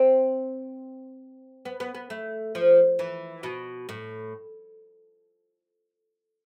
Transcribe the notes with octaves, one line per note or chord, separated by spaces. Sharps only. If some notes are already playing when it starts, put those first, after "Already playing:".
Already playing: C4
B3
B3
B3
A3
F3
E3
B2
A2